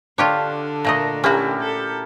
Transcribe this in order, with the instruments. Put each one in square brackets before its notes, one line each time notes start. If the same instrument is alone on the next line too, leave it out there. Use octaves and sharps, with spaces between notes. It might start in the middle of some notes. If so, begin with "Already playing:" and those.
[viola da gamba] D3 [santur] D4 [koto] F4 G4 C#5
[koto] A#2 A3 D#5 [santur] A#5
[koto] C#4 F#4 [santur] E4 G4 A#4
[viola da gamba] A4